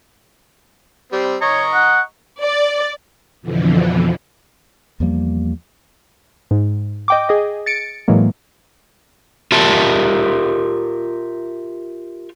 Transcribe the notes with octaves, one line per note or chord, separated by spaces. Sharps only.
G3 C4
C#5 D#5 A#5 C#6
F#5
D5
F2 B2 D3 E3 F3
E2 F3 G3 A#3
G#2
D#5 G5 D6
G#4 D#5
A6 C#7 D7
A2 E3 F#3 G#3 A#3
F4 G4 A#4 E5 A5